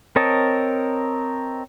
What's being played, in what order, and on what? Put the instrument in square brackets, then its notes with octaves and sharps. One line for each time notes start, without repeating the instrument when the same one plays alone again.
[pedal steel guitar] C4 A#4 C#5 D#5 A5